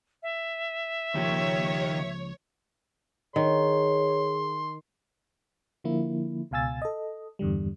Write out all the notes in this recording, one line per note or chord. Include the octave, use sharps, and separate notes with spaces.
E5
C#2 D#3 F3 A#3 G4 C#5
D#3 G#4 C#5 C6
D3 F3 A#3 E4
C#2 B2 F5 G#5 E6 A6
A4 D#5
E2 G2 D3 G3